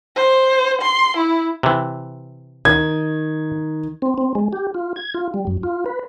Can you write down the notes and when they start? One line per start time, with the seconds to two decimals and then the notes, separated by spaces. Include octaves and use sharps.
0.16 C5
0.81 C6
1.17 E4
1.63 C3 E3
2.65 D#3 G#6
4.02 C4
4.18 C4
4.35 G#3
4.53 G4
4.74 F4
4.96 G#6
5.14 F4
5.34 G3
5.47 F#2
5.63 F4
5.86 B4